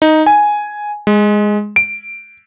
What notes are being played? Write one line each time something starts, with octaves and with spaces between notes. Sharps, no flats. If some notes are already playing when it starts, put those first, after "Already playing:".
D#4
G#5
G#3
D7